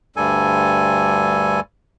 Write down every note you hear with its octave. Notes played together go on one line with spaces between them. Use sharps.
D2 G2 G3 A4 G#5